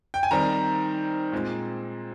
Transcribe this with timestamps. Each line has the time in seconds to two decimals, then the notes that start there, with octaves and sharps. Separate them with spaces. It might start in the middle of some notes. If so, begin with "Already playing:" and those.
0.14 G5
0.23 G#5
0.31 D#3 G3 C4 A#5
1.32 A#2 G#3 C4